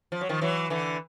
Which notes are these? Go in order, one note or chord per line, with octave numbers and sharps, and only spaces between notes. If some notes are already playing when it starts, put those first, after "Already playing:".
F3
F#3
D#3 F3
E3 F#3
D3 E3